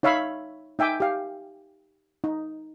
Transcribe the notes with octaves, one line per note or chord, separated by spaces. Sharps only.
D#4 C#5 E5 F5 B5
D#4 E5 G5 G#5 D6
G4 F5
D#4